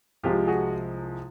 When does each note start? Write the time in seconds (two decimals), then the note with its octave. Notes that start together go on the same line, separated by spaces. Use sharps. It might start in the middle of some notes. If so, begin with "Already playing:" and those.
0.23 C2 C3 F3 G#3 F4 G4
0.47 F#4 G#4